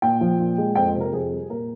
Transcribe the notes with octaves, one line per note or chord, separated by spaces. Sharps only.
A#2 G5
F3
A#2
G#3
F2 G5
C5
C3
A#4
F2 G#4
G3
A#2 A#4